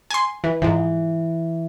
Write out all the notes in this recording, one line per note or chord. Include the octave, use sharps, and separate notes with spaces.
G#5 C6
E3
G#2 E3 F3